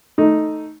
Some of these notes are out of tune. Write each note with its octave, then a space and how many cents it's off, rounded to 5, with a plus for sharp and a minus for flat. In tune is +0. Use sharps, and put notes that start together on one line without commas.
A3 +0 D#4 +0